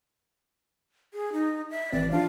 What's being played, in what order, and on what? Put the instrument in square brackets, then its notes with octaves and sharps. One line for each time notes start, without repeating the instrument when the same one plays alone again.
[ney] G#4
D#4
E5
[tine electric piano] G#1 E3 C4 [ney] D5
[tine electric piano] F3 D4 F4 [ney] F5